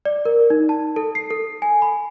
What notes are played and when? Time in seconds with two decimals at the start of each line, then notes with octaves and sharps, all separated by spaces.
0.05 D5
0.25 A#4
0.50 D#4
0.69 A5
0.96 A4
1.15 C7
1.30 A4
1.62 G#5
1.82 B5